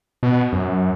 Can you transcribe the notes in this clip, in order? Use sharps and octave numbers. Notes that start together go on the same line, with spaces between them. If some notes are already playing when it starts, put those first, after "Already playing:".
B2
F#2